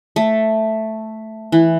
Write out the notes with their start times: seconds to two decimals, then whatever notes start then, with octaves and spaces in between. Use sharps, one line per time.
0.16 A3
1.52 E3